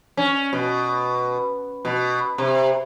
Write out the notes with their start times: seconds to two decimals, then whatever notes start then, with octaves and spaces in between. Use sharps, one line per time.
0.17 C#4
0.53 B2
1.85 B2
2.38 C3